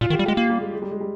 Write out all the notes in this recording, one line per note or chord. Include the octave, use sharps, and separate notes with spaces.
A#2 F4
D#3 G4
G3
G#3 G4
A#3 F4
G3
G#3
G#3
G3
G#3
G3